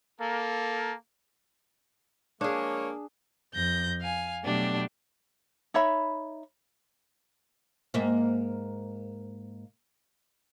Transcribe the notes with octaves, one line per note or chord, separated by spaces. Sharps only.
A#3 A4
F3 G#3 A#3 D4 G#4 C#5
F2 G6 A#6
F5 G#5
B2 F#3 A3 D4 G4
D#4 C#5 E5 B5
G#2 A#3 E5